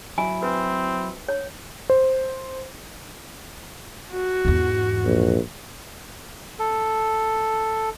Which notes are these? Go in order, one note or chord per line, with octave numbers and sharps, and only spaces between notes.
F#3 E4 G#5
C4 B4
C#5
C5
F#4
E2 G#2
A#1
A4